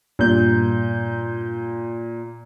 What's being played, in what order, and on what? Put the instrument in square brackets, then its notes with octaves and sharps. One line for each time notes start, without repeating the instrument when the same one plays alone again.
[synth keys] G2 G6 [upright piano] A#2